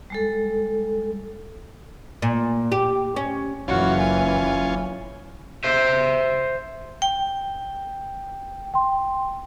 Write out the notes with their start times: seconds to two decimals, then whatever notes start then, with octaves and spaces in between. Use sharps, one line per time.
0.10 G3 G#3 A4
2.22 A#2
2.72 G4
3.16 C#4
3.68 F#1 E3 C#4 F4 F#4
4.01 G#5
5.64 C5 E5
7.02 G5
8.74 G5 C6